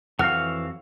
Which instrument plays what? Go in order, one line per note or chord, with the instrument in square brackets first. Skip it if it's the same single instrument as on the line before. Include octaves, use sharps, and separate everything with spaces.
[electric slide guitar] F2 F#4 F5 [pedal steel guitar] E3 C#5 F6 [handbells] F#5